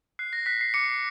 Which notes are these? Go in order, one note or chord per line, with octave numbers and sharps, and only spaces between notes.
F#6 C7
A#6
F#6 B6
C7
D6 C#7